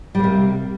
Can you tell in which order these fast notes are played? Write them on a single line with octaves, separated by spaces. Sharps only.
G3 A#3 C3